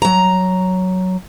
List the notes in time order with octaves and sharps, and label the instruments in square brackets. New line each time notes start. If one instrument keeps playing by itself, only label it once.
[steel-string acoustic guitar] F#3 A#5